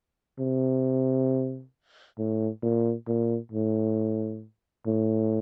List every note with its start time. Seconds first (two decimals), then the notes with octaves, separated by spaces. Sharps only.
0.39 C3
2.19 A2
2.63 A#2
3.08 A#2
3.52 A2
4.87 A2